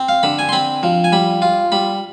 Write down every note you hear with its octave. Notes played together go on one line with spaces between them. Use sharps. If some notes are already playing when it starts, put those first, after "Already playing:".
Already playing: C4
F5
D3 B5
G#5
C6
C4 B5
F3
G#5
G3 B5
F4
G3 B5